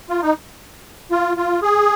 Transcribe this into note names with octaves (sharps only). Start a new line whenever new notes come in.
F4
D#4
F4
F4
G#4